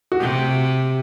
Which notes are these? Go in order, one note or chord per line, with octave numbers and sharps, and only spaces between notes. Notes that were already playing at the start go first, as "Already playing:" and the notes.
F#4
C3 G4